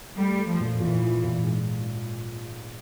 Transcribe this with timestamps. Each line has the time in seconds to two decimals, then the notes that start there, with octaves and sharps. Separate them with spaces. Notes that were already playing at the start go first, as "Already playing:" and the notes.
0.18 G3 A3
0.38 A3
0.49 F3
0.60 A#2
0.80 A#2 E3
1.02 F3
1.23 A#2
1.43 G#2